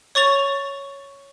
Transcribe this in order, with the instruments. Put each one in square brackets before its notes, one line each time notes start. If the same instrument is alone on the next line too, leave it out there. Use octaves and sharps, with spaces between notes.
[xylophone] C#5 C#6 A6 F7